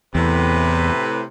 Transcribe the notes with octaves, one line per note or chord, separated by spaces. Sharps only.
E2 A2 C3 B4